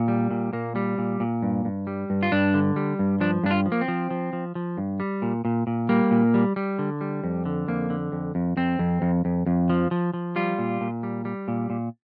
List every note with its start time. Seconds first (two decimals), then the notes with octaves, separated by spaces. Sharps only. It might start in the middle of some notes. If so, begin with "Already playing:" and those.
Already playing: A#2
0.08 G3
0.31 A#2
0.53 A#2 A#3
0.76 G3
0.98 A#2
1.20 A#2
1.43 G2
1.65 G2
1.87 G3
2.10 G2
2.23 F4
2.32 G2 D4
2.54 D3
2.76 G3
2.99 G2
3.21 F3 D4
3.44 G2 D4
3.51 F4
3.66 F3
3.72 A#3
3.81 C4
3.88 F3
4.11 F3
4.33 F3
4.55 F3
4.78 G2
5.00 G3
5.22 A#2
5.45 A#2
5.67 A#2
5.89 G3 A#3
6.11 A#2
6.34 G3
6.56 G3
6.79 D3
7.01 G3
7.24 F2
7.46 D3
7.68 F2 A#3
7.90 D3
8.12 F2
8.35 F2
8.57 F2 C4
8.79 F2
9.02 F2
9.25 F2
9.46 F2
9.70 F3
9.91 F3
10.14 F3
10.36 G3 F4
10.59 A#2
10.81 A#2
11.03 G3
11.25 G3
11.48 A#2
11.70 A#2